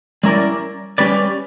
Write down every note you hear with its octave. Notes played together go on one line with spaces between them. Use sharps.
G3 C#4 E4 A#4 D5
G3 C#4 G4 B4 D5